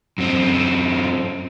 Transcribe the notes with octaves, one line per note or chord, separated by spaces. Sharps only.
F#2 C4